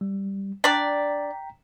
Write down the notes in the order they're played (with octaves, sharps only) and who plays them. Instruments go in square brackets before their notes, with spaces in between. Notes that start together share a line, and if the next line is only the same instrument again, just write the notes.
[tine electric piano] G3
[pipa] D4 D5 [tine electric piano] G5 A#5 B6